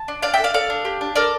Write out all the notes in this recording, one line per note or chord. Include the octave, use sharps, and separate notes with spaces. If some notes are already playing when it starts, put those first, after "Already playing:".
Already playing: A5
D4
D4 D5 F5
A4 E5 G5
D5 F5
A4 D5 F5
D4
G4
D4
A4 A#4 D5